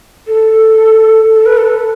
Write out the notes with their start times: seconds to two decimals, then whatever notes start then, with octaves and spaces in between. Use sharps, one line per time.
0.27 A4
1.34 A4
1.46 B4
1.57 A4